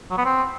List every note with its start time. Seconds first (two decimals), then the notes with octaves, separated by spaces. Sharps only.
0.11 F#3
0.18 B3
0.25 C4